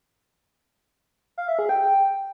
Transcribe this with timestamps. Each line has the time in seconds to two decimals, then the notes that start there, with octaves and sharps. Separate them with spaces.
1.38 F5
1.48 E5
1.59 G#4
1.69 G5